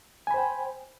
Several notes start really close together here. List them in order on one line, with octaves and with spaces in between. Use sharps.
G#5 B5 C5 G5